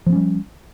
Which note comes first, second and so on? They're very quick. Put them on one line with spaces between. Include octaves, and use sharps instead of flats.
F3 B3 C#4 G3